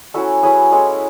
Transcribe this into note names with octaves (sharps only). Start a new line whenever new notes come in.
F#3 C#4 E4 F#4 A4
F#3 C#4 E4 G#4 B4
G#3 C#4 E4 A4 C#5